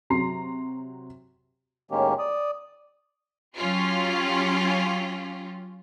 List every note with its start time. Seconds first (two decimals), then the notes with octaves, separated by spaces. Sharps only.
0.10 C3 F#3 A#5 C6 C7
1.91 A2 D#3 G#3 A#3 C#4 G4
2.19 D5 D#6
3.56 F#3 C#4 F4 G4